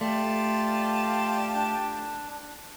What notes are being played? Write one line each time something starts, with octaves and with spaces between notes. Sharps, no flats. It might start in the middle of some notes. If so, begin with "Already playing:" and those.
A3 F4 G4 D5 A5 C6
D4